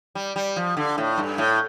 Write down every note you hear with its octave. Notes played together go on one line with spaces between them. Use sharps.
G3
G3
F3
D3
A2
G2
A2